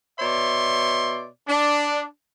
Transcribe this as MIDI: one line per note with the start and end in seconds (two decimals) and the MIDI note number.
0.20 1.27 47
0.20 1.27 73
0.20 1.27 74
0.20 1.27 76
0.20 1.27 84
1.48 2.05 62